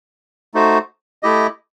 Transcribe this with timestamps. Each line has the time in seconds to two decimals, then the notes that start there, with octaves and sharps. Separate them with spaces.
0.54 A3 D#4 F#4 C5
1.23 A3 E4 G4 D#5